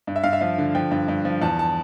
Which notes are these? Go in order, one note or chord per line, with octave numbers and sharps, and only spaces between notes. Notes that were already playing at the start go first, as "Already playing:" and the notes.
G2
E5
G2 F5
E5
F3 F5
D3
F3 G5
G2
G2
F3
E2 A5
A5